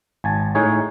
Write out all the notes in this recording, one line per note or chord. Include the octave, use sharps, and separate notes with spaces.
G#1 G#5 A5
A2 D#4 G#4 C#5